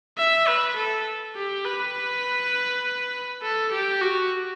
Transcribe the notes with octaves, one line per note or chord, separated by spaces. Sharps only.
E5
B4
A4
G4
B4
A4
G4
F#4